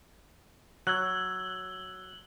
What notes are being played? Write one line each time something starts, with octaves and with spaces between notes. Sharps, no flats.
F#3 E6 F#6 G#6 F#7 G7